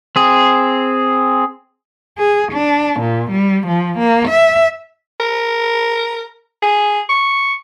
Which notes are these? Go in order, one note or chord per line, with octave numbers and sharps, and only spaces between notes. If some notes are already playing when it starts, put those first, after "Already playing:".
C4 G#4
G#4
D4
A#2
G3
F3
A#3
E5
A#4
G#4
C#6